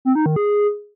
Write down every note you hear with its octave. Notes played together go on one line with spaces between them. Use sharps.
C4
D#4
D#3
G#4